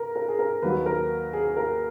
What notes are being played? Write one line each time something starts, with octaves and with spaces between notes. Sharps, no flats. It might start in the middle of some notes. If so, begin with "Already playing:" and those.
Already playing: A#4 B4
A#4
G#4
A#4
D#2 D#3 F#3 B4
A#4
G#4
A#4